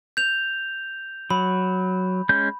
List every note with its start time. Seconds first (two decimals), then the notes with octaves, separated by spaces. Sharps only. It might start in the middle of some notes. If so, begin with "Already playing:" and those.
0.17 G6 F7
1.30 F#3 B5
2.29 G#3 C#4 G6